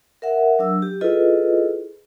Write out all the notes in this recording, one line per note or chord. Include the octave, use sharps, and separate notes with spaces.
A#4 E5 F#5
F#3 D4 E6
G4
E4 F4 G#4 A4 B4 D#5